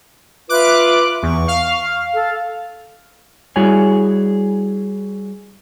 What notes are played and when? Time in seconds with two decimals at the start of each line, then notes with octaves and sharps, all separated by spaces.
0.49 F4 B4 E5 D6 F#6
1.23 E2 C#6
1.48 F5
2.14 A4
3.56 G3 E4 F#4 G#4 C#5 G#5